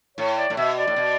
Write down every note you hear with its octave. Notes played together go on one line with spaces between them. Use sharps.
A2 C#5
D5
A2
B2 E5
D5
A2
B2